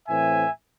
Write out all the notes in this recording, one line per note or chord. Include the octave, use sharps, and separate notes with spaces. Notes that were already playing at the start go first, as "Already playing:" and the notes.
A2 E3 C4 E5 G#5